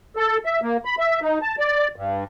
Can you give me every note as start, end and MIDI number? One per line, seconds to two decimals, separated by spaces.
0.16 0.38 69
0.45 0.60 76
0.62 0.77 58
0.85 0.95 83
0.99 1.19 76
1.22 1.38 63
1.42 1.55 81
1.59 1.88 74
1.96 2.24 43